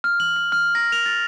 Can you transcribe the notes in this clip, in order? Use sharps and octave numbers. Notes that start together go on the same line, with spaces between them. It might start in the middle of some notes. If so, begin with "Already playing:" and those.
F6
F#7
F6
F6
A#6
F7
A6